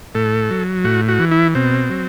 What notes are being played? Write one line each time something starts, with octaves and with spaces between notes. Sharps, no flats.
A2 A4
F#3
A2 F#4
F#4
E3
E4
B2 C4
F#3